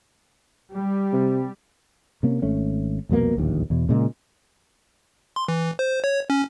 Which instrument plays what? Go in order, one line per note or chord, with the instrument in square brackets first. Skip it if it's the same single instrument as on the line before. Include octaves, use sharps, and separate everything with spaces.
[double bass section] G3
[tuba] C3
[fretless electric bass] C3 A#3 C#4
G#1 A3 C#4
C2 F2 B2 A#3
D1 A#1 D#2
E2 B2
A#2 C#3 G#3
[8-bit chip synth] C6
E3
C5
C#5
C#4